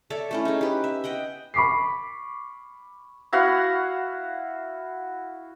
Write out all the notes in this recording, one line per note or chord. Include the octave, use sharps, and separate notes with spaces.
A4 C#5 D5 E5
A3 C#4 E4
D#4 G#4
G4 B4
E5
D#5 F#5 G5
B5 C#6 D6 B6 C7
E4 F#4 F5 F#5